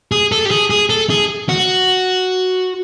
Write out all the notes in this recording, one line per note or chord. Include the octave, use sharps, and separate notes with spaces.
G#4
A4
G4
G#4
G#4
A4
G#4
F#4